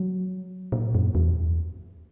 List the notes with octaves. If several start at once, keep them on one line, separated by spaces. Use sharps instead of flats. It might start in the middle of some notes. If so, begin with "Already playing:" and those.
Already playing: F#3
A#2
F#2
E2